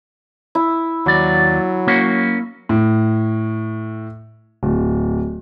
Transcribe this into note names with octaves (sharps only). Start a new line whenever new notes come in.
E4
D#2 F#3 D5
A#3 C#4 F#4
A2
D1